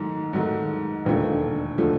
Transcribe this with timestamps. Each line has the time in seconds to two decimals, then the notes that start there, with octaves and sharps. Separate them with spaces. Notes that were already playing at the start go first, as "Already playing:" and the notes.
Already playing: G#2 D#3 F#3 A3
0.33 G#2 D#3 F#3 A3
1.05 E1 D#2 D3 F3 A3
1.78 D3 F3 A3